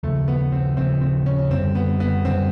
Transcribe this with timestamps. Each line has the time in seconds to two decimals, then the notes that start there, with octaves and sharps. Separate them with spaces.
0.03 D#2 C#3 F3 A3
0.28 B3
0.52 C4
0.77 D#2 C#3 F3 C4
1.01 C4
1.26 C#4
1.50 F#2 D3 G3 C4
1.75 B3
2.00 B3
2.25 F#2 D3 G3 C4